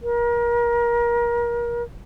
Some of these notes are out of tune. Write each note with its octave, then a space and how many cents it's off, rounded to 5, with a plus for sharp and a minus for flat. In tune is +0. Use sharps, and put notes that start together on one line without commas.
A#4 +30